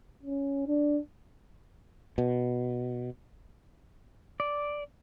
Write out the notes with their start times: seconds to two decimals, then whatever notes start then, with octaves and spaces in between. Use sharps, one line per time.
0.23 C#4
0.67 D4
2.18 B2
4.40 D5